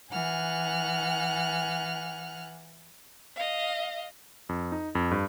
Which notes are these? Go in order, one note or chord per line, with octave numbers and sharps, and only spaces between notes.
E3 F#5 G#5 F6 F#6
D#5 F5
F2
D#4
F2
G2